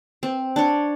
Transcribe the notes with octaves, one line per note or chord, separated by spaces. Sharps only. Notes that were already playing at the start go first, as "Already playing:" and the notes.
C4
D4 C#5